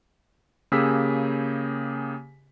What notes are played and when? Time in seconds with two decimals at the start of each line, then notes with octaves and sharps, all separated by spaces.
0.72 C#3 A#3 G4 G#4 E6 B6